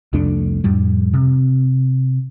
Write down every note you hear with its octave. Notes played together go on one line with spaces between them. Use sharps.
C2 F2 A3 D4
F2 A2 G3
C3